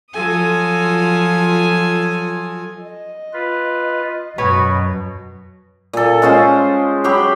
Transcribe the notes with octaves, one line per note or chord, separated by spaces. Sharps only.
F3 F#3 F4 A4 G#5 D#6
D#5
F4 B4
F#2 B2 F#4 B4 C#5
A#2 A4
G#3 C#4 F4 C5
F#3 G4 B5 C6